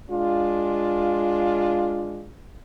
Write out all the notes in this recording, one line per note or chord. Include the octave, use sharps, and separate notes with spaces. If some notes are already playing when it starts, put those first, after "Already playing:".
G#3 D4 F4